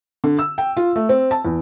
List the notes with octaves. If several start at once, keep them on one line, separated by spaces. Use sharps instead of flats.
D3
E6
G5
F4
A3
C4
A5
E2